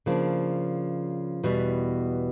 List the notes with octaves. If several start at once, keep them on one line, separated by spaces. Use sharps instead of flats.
C#3 F3 A#3 D4
E2 B2 G3